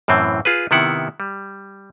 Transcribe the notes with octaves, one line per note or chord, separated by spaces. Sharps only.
F#2 A2 E3 C4
F4 G#4 B4
C3 D#3 B3 E4 F#5
G3